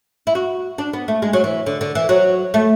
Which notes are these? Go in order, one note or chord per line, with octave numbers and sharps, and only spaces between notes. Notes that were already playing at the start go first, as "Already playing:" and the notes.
E4
F#4
D4
B3
A3
G#3
F#3
E3
D3
D3
E3
F#3
A3